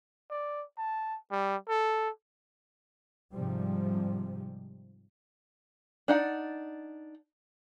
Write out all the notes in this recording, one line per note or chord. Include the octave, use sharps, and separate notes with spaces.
D5
A5
G3
A4
G#2 C3 F3 G3
D4 D#4 F#5